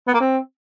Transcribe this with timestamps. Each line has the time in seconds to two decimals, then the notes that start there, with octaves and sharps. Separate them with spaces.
0.07 B3
0.14 A#3
0.21 C4